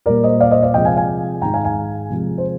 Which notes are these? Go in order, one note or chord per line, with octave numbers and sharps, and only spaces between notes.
A#2 G3 A#3 A#4 D5
C5 D#5
D5 F5
C5 D#5
D5 F5
C3 F3 G#3 D#5 G5
F5 G#5
F5 G#5
G#2 D#3 G#3 G5 A#5
F5 G#5
F5 G#5
C3 F3 G#3
C5